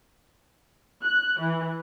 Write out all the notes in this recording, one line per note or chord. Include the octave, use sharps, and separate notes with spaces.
F#6
E3